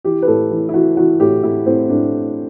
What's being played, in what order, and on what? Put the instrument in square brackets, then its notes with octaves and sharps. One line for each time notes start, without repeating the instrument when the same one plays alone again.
[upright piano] E3 G4
B4
A2 A4
E3
E4
E3 F#4
E3 F#4
A2 G4
A2 E4
A2 C4
A2 D4